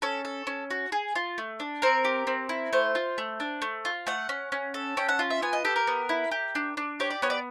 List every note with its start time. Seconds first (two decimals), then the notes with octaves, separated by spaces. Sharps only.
0.02 C#4 A4
0.25 A4
0.47 C#4
0.70 F#4
0.92 G#4
1.15 F4
1.38 A3
1.60 D4
1.82 C4 A#4
2.05 G4
2.27 C4
2.49 E4
2.73 A3 C5
2.95 F4
3.18 A3
3.40 D4
3.62 A3
3.85 F4
4.07 A3 F#5
4.29 C#4
4.52 C#4
4.74 A4
4.97 C#4 G5
5.09 F#5
5.19 F4
5.30 E5
5.42 B3 G#5
5.53 D#5
5.65 G4 A4
5.76 A#4
5.87 B3
6.09 E4
6.31 G4
6.55 D4
6.77 D4
7.00 G4 C#5
7.11 D5
7.22 B3 C#5
7.30 D5